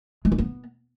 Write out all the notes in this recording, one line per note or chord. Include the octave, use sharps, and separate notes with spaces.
G#3
C#4
B3